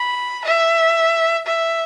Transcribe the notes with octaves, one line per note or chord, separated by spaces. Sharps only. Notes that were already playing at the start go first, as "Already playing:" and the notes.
Already playing: B5
E5
E5